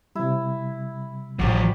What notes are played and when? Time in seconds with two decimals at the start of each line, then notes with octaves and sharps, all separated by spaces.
0.15 C3 G3 E4
1.39 A1 D3 F3 F#4 G4 D5